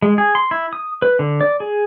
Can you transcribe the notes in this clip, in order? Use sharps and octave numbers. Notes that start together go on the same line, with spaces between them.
G#3
G#4
C6
E4
D#6
B4
D3
D5
G#4